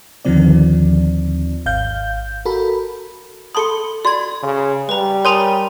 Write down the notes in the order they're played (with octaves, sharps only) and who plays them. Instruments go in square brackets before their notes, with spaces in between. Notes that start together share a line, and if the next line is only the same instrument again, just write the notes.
[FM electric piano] D#2 D3 D#3 F3 C4 D5
G#1 F5 G6
F#4 A4 A#4 B5
[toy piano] A4 A5 D#6 [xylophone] B5 C6 C#7
[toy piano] F#4 C6 [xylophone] D5 G#6
[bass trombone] C#3
[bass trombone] G3 [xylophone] B4 A#5
[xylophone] A#4 G#5 A#5 [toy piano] C#5 C6 D#6